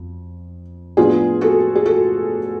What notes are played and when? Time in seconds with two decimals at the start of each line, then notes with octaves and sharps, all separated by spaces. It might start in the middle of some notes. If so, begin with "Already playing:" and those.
Already playing: F2
0.97 A2 F3 B3 D4 F4 G#4
1.41 F#4 A4
1.75 G#4
1.86 F#4 A4